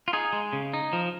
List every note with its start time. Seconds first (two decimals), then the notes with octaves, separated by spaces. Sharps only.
0.08 F4
0.13 D#4 G#4
0.33 G#3
0.53 C#3
0.74 D#4
0.93 F3